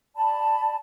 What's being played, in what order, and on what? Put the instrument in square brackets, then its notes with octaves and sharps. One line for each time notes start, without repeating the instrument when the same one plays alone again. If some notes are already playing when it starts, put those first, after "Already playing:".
[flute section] D5 A5 B5